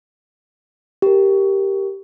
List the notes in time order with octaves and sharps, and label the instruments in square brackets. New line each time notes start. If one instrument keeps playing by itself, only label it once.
[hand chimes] G4 A#4